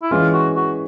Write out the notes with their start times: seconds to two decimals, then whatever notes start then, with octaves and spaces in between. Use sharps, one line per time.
0.03 E4
0.11 E3 G#3 C#4 F4
0.33 F#4
0.56 F#4